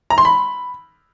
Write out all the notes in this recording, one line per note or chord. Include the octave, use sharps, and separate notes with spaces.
A#5
C6
B5